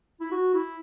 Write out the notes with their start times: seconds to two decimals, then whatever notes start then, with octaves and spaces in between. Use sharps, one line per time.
0.20 E4
0.31 F#4
0.54 E4